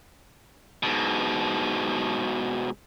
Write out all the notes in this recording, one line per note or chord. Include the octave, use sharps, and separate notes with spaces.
G#2 B2